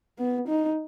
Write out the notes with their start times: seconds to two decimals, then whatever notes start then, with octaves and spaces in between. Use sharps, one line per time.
0.18 B3
0.48 D#4